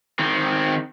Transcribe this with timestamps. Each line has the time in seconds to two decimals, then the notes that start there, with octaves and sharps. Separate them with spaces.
0.19 D#3 C4